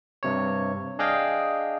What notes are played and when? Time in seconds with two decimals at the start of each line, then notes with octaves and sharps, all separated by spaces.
0.23 G2 C3 C#5
0.99 D4 G#4 D#5 F5 G5